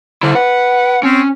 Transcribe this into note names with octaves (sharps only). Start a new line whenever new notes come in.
D3 E4 C5
B4 F#5
C4 C#4